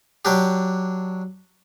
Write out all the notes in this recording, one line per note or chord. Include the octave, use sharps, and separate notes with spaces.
F#3 D4 G4